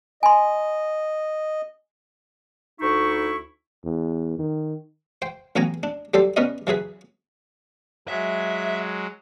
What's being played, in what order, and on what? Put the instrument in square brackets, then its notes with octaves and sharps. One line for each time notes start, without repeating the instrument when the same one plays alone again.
[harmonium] D#5 [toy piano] G#5 C6
[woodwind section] D2 D#4 E4 C#6
[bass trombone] E2
D#3
[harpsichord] C5 G5
A1 F#3 B3 G5 G#5 A#5
D4
F#3 G3 G4 A4 C5 D5
B3 C#4 A#4 B4 D5 D#5
E3 F#3 G#4 B4
[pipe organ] F#3 G#3 [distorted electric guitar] E5